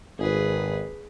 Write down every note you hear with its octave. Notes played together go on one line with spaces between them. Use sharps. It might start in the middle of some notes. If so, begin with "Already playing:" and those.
G#1 G#4 B4